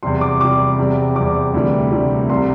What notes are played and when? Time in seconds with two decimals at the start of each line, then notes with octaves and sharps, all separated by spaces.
0.03 E2 C3 G3 C6
0.21 D6
0.41 E2 C3 G3 D6
0.79 E2 C3 G3
1.16 E2 C3 G3 D6
1.54 D2 C3 E3 G3
1.92 D2 C3 E3 G3
2.29 C2 C3 G3 C6